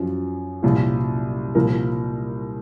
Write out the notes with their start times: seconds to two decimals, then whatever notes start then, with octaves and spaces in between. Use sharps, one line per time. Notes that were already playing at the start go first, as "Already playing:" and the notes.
Already playing: F#2 F3
0.63 C2 A#2 F3
1.55 C2 A#2 F3 A#4